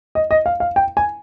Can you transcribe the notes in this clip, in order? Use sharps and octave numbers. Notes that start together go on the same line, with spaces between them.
D#5
D#5
F5
F5
G5
G#5